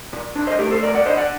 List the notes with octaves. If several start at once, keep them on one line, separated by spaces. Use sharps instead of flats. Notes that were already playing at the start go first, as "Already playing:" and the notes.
A#2
D4
C5 D#5
A3 G4 A#4
A4 C5
F#2 A#4 D5
D5 F#5
D3 C5 D#5
D5 F#5